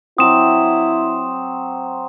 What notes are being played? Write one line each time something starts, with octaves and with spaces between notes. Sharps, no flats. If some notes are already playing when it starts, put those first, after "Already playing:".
F#3 C4 E4 D#6 E7